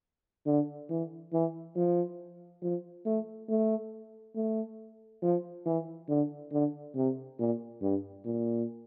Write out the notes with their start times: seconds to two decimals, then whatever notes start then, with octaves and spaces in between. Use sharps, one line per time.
0.46 D3
0.90 E3
1.33 E3
1.76 F3
2.63 F3
3.06 A3
3.49 A3
4.36 A3
5.23 F3
5.66 E3
6.09 D3
6.52 D3
6.95 C3
7.39 A#2
7.82 G2
8.25 A#2